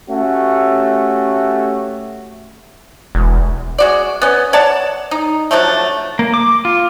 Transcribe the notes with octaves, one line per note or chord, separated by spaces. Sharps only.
A3 C#4 F#4 G4
E1
G#3 F#4 D5
B3 C#4
C#5 D5 F#5 A5
D#4
D3 F3 F#3 A3
A#3
D6
F4